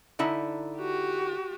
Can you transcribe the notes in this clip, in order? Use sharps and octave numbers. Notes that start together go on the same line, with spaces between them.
D3 D#4 E4
F#4 G4